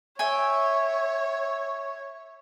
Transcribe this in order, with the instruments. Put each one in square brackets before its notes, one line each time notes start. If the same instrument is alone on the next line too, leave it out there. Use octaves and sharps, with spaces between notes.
[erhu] C#5 [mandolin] E5 G5 G#5